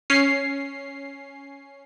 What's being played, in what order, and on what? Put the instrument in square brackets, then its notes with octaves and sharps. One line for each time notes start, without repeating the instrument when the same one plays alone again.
[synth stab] C#4 C7